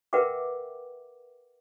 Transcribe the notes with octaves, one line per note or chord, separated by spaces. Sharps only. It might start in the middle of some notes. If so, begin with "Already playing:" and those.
A#4 B4 E5 F#5 G5 D6